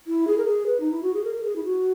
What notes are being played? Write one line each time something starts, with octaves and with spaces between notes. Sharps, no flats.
E4
G#4
A#4
G#4
B4
D#4
E4
F#4
G#4
A#4
A#4
G#4
E4
F#4